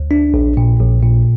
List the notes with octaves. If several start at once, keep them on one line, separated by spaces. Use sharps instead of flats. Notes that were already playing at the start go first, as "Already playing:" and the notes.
Already playing: D2
D4
A#1
A#2
A#1
A#2